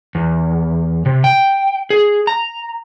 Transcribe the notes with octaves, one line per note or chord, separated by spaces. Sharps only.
E2
C3
G5
G#4
A#5